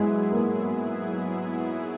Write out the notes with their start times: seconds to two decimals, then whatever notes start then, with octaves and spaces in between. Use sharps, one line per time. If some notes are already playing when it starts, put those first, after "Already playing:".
Already playing: G#2 F#3 G#3 B3 E4 G#4
0.31 A#3